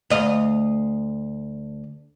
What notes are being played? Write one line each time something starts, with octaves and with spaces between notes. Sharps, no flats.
D2 D#5 F5